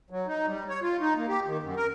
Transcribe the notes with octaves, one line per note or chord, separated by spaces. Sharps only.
F#3
D#4
G3
C#5
F4
D#4
A#3
G4
D#3
F#2
A#4